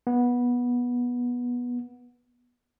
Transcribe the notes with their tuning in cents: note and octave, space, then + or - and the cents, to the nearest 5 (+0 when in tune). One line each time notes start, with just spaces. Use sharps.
B3 -15